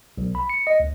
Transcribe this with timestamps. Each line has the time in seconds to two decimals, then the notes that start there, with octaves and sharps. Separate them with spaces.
0.18 B1
0.35 B5
0.50 C#7
0.67 D#5
0.80 D2